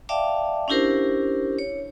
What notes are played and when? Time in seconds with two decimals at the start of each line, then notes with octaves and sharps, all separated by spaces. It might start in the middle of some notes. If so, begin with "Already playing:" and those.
0.09 D5 E5 F5 G5 A5 D6
0.68 C#4 D4 E4 G4 A#4 C5
1.59 C#5